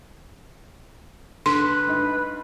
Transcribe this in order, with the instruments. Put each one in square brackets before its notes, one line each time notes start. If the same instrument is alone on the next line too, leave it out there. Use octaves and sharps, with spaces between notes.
[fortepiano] D3 [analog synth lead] B4 [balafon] C6
[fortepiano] G2 D#4